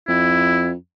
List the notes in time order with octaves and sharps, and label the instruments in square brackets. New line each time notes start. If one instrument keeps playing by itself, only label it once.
[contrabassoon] F2 [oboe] E4